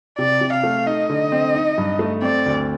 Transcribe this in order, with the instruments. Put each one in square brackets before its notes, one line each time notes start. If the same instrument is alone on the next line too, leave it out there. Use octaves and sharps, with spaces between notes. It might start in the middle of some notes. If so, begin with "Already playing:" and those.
[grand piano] C3 [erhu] D5
[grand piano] C3
[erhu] F5
[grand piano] A3
[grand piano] D#4 [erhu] D#5
[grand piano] D3
C4
D#4
G2
A3
[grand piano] C4 [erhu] D5
[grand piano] D2